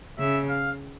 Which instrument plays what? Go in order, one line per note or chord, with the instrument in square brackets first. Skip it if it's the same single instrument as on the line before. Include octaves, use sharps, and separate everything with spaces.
[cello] C#3 [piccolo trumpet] E5
[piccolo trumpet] F5